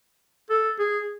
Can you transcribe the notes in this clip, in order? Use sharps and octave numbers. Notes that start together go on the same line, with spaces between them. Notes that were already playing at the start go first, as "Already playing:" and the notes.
A4
G#4